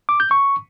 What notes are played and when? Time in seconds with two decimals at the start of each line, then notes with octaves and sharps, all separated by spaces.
0.09 D6
0.20 G6
0.31 C#6